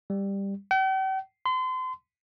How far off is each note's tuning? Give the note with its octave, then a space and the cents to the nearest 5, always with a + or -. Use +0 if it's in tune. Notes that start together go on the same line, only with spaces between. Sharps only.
G3 +10
G5 -45
C6 -35